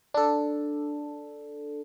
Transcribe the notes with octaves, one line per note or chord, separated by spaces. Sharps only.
D4 A4